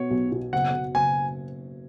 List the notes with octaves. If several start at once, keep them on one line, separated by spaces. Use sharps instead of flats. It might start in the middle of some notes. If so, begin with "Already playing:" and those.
Already playing: B2 B3 C#5
B1
B2
F#1 F#5
F#1
F#1 G#5